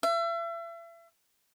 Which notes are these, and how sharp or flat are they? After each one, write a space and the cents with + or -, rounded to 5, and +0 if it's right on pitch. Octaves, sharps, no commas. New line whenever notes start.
E5 +35